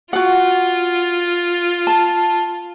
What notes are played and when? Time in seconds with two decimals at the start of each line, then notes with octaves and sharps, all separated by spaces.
0.13 F4 F#4 F#5
1.87 A5